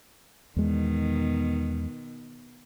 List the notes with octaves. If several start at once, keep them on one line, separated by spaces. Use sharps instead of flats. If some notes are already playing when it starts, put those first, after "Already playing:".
E2 B2 D#3 G#3